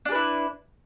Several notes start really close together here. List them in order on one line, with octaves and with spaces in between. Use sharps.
D4 G#4 B4 E4